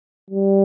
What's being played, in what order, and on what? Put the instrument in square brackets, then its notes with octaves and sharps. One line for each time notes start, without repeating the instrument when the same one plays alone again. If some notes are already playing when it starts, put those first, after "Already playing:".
[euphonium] G3